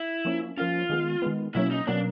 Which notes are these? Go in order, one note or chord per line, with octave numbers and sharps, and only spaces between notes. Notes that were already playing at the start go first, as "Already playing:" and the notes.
Already playing: E4
F3 A#3 C#4
F3 A#3 C#4 F4
D#3 G#3 B3
D#3 G#3 B3
B2 F#3 A#3 C#4 E4
D#4
B2 F#3 A#3 C#4 D4